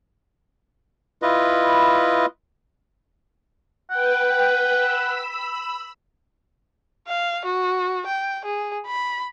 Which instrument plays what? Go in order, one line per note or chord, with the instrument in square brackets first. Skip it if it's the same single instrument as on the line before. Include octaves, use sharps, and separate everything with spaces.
[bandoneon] E4 F4 B4 D#5
[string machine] B4 G5 [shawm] F#5
[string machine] B5 E6
[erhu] F5
F#4
G5
G#4
B5